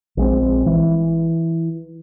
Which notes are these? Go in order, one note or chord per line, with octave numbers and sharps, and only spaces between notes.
A#1 G#3 C4
E3